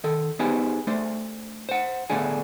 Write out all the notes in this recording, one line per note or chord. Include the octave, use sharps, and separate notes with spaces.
D#3 A4
B3 D#4 G4 G#4 B4 C5
A3 D4 C5
C5 F#5
A2 D3 A3 B3 D4 G#4